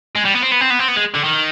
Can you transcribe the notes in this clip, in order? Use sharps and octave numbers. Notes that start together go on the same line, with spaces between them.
G#3
G3
B3
C4
B3
C4
B3
C4
B3
G#3
D3
D#3